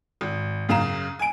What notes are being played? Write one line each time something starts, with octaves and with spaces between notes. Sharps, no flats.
G#1
F#2 C#3 F5 A#5 E7
G#5 D7